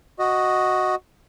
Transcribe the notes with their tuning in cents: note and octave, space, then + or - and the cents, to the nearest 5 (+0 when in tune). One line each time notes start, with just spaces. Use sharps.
F#4 +0 D#5 +0